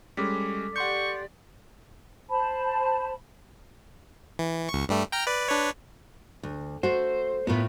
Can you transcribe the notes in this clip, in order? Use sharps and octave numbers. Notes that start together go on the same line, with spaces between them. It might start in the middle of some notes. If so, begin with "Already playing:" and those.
G3 G#3 C#4 A4 D6 B6
G4 D5 F#5 C6 C#6 G6
C5 A5 B5
E3
C#2 C#6
G2 G3 A3
G5 A#5 F6
B4 D5
D4 B4 C#5
D2
A3 F#4 C5
A2 B3 F4 A#4